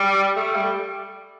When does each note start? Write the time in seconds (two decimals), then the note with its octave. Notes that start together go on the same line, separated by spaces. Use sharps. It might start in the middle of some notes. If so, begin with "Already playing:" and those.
Already playing: G3
0.36 A3
0.56 G3